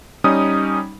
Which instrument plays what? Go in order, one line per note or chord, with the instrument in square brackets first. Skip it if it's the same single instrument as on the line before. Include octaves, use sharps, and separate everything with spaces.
[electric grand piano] G3 C#4 D#4 D#6